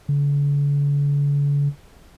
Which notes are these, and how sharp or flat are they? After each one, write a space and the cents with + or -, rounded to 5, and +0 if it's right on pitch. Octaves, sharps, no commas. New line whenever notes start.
D3 -45